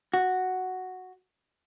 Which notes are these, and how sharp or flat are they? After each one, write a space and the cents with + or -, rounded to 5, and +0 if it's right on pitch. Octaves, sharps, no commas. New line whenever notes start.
F#4 +0